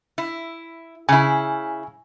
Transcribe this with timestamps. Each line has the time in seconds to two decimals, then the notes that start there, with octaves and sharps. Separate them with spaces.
0.18 E4
1.09 C#3 E4 G#5